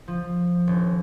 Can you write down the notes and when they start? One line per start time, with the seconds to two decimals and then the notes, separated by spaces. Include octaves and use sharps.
0.08 F3
0.67 D#1